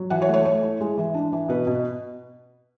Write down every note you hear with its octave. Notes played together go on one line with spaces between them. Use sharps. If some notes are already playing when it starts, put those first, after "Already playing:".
Already playing: F#3
E3 F#5
C#5
A3
C#5
A3 C#5
E4
G#3
E3
D4
E3
B2 B4
B2